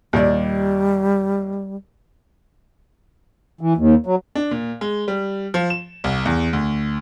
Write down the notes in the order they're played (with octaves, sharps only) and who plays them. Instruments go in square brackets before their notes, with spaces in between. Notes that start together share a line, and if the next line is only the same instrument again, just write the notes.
[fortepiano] D#2 A#2 D5 [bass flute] G3
[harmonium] E3
D#2
F#3
[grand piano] D4
A#2
G#3
G3
F3
E7
C2
E2
D2